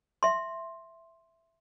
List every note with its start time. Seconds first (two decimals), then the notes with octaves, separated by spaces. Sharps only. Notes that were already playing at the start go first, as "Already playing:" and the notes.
0.23 E5 C6